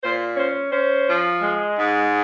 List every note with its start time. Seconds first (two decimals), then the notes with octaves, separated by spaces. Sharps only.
0.03 A#2 C5
0.37 C#4 C5
0.72 C#4 C5
1.07 F3
1.42 G#3
1.76 G#2